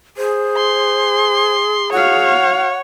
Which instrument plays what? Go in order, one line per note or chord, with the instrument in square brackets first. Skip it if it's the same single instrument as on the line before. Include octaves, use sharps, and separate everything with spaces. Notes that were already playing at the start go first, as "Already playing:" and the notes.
[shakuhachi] G#4 [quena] C5
[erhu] C6
[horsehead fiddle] F#4 F5 [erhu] C#5 [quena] F#5